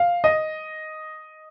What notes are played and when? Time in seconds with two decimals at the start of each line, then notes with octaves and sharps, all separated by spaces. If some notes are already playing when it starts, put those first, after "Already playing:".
Already playing: F5
0.24 D#5